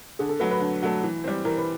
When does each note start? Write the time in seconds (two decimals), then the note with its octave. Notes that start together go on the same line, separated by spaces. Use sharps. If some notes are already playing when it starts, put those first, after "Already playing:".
0.19 D3 G#4
0.29 A4
0.40 F#3 A3 B4
0.51 B4
0.61 D3
0.82 F#3 A3
1.03 E3
1.24 G3 C4
1.45 E3 A#4
1.58 B4